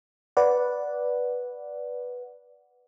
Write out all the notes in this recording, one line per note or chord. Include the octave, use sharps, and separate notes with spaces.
B4 D5 F#5